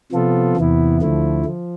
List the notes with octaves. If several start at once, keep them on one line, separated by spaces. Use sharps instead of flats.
C3 F3 B3 F4 A4
E2 C3 E3 B3 E4
D2 D3 F3 A3 E4
F3